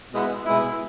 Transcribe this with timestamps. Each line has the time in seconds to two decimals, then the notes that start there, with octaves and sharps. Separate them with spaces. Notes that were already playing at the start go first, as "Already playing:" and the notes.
0.11 B2 G#3 B3 E4
0.45 B2 G#3 B3 E4